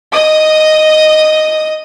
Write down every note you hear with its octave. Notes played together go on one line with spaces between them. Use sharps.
D#5 D#6